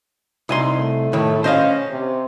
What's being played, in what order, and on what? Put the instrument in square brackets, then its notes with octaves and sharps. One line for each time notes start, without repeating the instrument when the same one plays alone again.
[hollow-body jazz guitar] C2 G#5 C6 [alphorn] D#4
[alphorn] A3
[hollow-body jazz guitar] A2 D#3
[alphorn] C#4 [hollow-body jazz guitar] C5 D#5 F5
[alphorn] C3